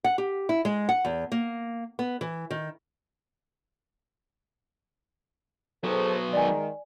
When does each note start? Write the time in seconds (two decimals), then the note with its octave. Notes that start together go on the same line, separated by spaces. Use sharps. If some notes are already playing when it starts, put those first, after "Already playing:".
0.04 F#5
0.18 G4
0.49 E4
0.65 G#3
0.89 F#5
1.05 E2
1.32 A#3
1.99 B3
2.21 E3
2.51 D#3
5.84 F#3 B3 G#4 A4 C5
6.33 D#3 G#3 D5 G#5